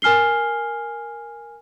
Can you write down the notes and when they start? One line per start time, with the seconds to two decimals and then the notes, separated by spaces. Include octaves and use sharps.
0.02 A#4 G#5 F6 C7 G7